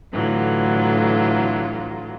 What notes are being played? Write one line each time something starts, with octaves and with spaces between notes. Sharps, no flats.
A2 D3 E3 F#3 F4